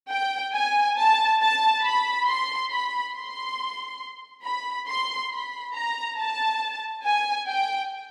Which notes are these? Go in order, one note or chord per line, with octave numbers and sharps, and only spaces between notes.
G5
G#5
A5
A5
B5
C6
B5
C6
B5
C6
B5
A#5
A5
G#5
G5